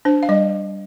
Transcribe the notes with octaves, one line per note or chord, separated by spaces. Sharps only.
D4 C5
F5
G3 D#5